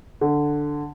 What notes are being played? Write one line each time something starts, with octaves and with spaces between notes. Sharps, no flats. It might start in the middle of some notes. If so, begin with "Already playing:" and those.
D3